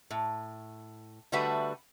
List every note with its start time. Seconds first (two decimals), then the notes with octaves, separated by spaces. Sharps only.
0.11 A2
1.32 D3 G3 A3 F#4 B4 E5